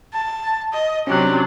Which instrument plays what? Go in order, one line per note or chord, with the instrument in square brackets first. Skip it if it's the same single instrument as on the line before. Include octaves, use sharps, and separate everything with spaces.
[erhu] A5
D#5
[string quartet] C3 F#3 D4 [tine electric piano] C#4 F#6 [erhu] G4